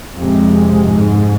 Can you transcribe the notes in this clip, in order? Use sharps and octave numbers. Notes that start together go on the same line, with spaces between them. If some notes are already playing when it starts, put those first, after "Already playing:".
F2 C3 G#3
G#2